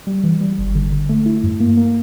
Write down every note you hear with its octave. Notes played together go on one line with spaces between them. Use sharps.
G3
E3
G3
G1
D3
D3
A3
E4
G2
A#3
A#3